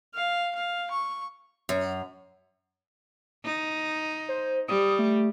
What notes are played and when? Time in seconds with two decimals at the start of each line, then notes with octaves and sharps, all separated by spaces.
0.15 F5
0.55 F5
0.91 C#6
1.69 F#2
3.45 D#4
4.29 C5
4.68 G3 D#6
4.99 A3